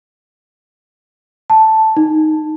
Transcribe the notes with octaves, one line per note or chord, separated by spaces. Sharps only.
A5
D#4